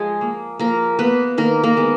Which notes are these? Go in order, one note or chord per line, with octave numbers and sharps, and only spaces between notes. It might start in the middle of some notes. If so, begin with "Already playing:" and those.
Already playing: F3 G#3 G#4
A#3
F3 A#3 A#4
A#3 B3 B4
D#3 A#3 A#4
A#3 A#4
G#3 B3